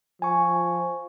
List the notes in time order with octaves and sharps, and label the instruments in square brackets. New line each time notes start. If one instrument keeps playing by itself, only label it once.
[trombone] F3 [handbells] G#5 C#6